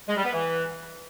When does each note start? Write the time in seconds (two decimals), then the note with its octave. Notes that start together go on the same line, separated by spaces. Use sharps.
0.08 G#3
0.16 G3
0.25 B3
0.33 E3